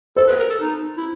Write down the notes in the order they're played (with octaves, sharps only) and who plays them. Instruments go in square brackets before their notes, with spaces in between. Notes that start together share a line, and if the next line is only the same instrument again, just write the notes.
[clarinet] A4 [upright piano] C5
[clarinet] B4
A#4
A4
D#4
E4